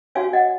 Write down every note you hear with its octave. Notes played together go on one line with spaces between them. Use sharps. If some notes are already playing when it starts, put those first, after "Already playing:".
F#4 C#5 F5 G#5
D#5 F#5